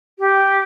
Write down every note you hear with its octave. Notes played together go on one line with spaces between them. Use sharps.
G4